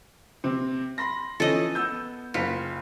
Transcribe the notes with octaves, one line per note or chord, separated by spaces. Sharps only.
C3 C4
B5 C6 A#6
E3 F3 C#4 A4 D#5
B3 E6 G6
F#1 F4 B6 C#7